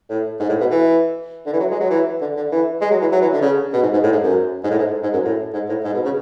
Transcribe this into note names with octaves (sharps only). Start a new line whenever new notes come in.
A2
G#2
A2
B2
E3
D3
E3
F#3
G#3
F#3
E3
D3
D3
E3
G#3
F#3
E3
F#3
E3
D3
C#3
B2
G#2
G#2
A2
G#2
F#2
G#2
A2
G#2
G#2
F#2
A2
G#2
A2
G#2
B2
C#3